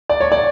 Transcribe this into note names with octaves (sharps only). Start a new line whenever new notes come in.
D5
C#5
D5